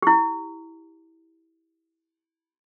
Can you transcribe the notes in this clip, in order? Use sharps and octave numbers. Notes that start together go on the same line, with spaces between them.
E4 G4